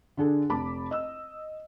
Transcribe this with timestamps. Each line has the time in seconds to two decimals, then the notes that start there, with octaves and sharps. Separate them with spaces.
0.17 D3 D4 G#4 A4
0.49 F1 A5 B5 D6
0.91 D#5 E6